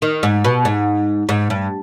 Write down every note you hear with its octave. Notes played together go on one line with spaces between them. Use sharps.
D#3
G#2
B2
G#2
G#2
G2